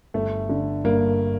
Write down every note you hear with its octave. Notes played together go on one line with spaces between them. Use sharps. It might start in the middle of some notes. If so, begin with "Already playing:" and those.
G1 A3
D3
G2 A#3